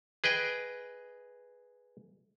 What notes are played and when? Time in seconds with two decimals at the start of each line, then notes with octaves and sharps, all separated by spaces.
0.24 G#4 B4 D#5 G5